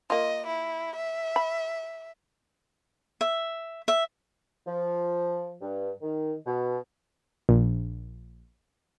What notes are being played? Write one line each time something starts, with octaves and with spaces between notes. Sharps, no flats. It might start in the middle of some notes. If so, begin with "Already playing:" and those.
A#3 F4 D#5
E4
E5
B5
E5
E5
F3
G2
D#3
B2
A#1